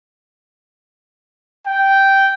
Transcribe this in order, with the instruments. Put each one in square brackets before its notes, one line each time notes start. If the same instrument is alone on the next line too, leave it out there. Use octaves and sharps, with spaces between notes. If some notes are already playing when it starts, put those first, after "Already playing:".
[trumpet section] G5